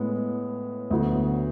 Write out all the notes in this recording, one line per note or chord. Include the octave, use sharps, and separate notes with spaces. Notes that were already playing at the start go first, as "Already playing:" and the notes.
Already playing: A2 G#3 B3
D2 D3 F#3 B3